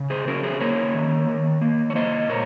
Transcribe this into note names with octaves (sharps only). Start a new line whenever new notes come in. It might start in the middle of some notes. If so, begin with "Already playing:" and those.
Already playing: C#3
G#4 C5
C#4 F#4 A#4
G#4 C5
A#3 A#4 C#5
D#3
D#3
A#3
C#5
A#3 C5 D#5
A#2 A#4 C#5